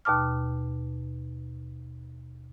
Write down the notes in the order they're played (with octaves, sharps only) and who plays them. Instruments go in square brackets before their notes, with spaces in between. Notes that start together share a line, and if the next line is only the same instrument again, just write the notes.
[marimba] D#2 B2 A5 D6 F6